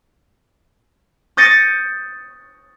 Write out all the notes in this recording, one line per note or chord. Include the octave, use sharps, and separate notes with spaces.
D#6 G6 A6 A#6 C#7 D#7